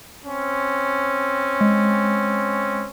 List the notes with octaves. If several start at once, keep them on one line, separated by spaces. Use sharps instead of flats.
C4 C#4
G#3